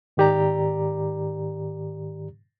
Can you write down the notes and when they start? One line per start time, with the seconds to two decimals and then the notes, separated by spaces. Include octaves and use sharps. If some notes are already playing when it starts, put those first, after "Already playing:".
0.17 G#2 D#3 G4 D5 A#5